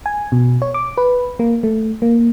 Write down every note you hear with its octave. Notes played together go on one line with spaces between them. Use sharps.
G#5
B2
C#5
D6
B4
A#3
A3
A#3